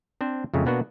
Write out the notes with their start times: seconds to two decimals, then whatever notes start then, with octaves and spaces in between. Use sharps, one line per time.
0.21 C4 D4 C5
0.54 F2 A#2 C#3 G#3 A3
0.65 B2 A#3 B3 D4 F#4